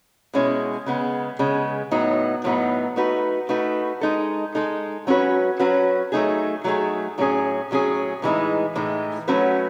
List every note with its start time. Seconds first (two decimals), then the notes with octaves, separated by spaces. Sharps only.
0.34 B2 G#3 C#4 E4
0.86 C#3 G#3 B3
1.39 C#3 G#3 B3
1.91 A2 F#3 B3 D#4
2.44 A2 F#3 B3 D#4
2.96 A3 D#4 F#4 B4
3.49 A3 D#4 F#4 B4
4.01 G#3 D#4 A4
4.55 G#3 D#4 A4
5.07 F#3 C#4 F#4 B4
5.59 F#3 C#4 F#4 B4
6.12 F#3 A3 D#4 G#4
6.64 F#3 A3 D#4 G#4
7.18 A2 F#3 C#4 G#4
7.71 A2 F#3 C#4 G#4
8.22 A2 E3 G#3 D#4
8.75 A2 E3 G#3 D#4
9.28 F#3 A3 C#4 F#4 B4